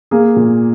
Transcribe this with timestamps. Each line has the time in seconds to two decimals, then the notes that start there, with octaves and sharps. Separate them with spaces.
0.11 A#3 G#4
0.36 A#2